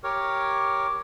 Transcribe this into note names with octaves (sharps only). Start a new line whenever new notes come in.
G4 A#4 C#5